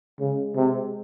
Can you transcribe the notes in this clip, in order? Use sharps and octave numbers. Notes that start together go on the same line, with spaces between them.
C#3 G#3
C3